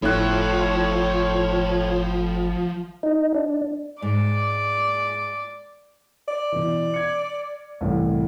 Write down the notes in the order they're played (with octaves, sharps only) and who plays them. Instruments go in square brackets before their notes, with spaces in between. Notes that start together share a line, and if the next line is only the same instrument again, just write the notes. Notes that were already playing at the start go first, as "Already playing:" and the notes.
[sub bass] G1 [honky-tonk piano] A2 F#6 [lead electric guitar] F3 [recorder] C#5
[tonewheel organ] D#4
D4
[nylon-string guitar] G#2 [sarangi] D5
[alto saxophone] D5
[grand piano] B2 E3
G#6 C#7
C2 A2 E3